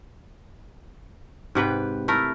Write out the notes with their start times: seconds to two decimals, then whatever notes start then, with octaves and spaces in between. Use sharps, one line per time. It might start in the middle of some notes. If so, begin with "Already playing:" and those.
1.55 G#2 C3 B4 G5
2.08 A3 E4 A#4